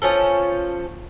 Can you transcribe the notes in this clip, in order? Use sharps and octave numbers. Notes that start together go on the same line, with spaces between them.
F3 C#4 A4